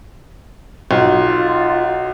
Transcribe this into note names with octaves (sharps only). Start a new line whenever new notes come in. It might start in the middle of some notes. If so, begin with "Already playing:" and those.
B1 F4